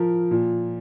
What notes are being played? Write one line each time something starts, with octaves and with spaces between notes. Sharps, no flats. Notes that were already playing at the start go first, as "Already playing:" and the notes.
Already playing: F3 A#4
A#2